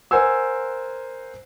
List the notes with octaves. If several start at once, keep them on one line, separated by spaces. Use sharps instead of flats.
A#4 C5 F#5 G#5 E6